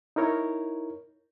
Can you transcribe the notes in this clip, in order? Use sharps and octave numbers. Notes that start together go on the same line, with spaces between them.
D#4 E4 A#4 C#5